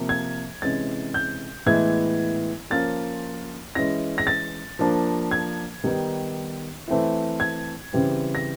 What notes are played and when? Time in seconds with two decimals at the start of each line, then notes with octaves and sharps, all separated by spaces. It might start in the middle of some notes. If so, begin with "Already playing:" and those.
Already playing: C3 F3 A#3
0.09 G#6
0.62 C3 E3 G#3 C#4 A6
1.14 G6
1.66 A2 E3 G#3 B3 E4 G#6
2.70 F3 A#3 C#4 F4 A6
3.75 E3 G#3 C#4 E4 A#6
4.18 A#6
4.27 A6
4.79 F3 A#3 D4
5.31 G#6
5.84 D#3 G3 B3 D#4
6.88 E3 A3 C4 E4
7.40 G#6
7.93 C#3 E3 G3 C4
8.35 A#6